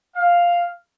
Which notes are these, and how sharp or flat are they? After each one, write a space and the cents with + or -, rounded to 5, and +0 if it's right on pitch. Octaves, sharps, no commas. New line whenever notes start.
F5 +0